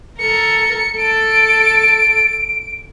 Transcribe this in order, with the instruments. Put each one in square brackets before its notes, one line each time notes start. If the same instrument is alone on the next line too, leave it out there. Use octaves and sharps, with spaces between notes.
[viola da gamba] A4 A#4 [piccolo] C#7
[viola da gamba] A4 [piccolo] D7